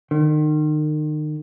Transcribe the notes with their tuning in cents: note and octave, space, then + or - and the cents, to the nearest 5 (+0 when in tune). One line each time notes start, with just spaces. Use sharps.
D#3 -35